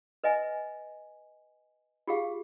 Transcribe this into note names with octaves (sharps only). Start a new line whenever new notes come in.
B4 D#5 E5 G#5
F4 G4 G#4 F5